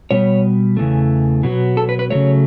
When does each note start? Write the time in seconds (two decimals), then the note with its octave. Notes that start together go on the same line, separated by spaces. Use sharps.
0.11 B2 G3 B3 C#5
0.77 E2 C#3 E3 A3
1.43 B2 F#3 B3
1.77 A4
1.89 B4
1.99 B4
2.10 C#3 F#3 A3 C#5